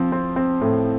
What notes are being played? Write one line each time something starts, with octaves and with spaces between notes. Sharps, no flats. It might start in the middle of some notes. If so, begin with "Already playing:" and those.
Already playing: F3 C4
C4
C4
A2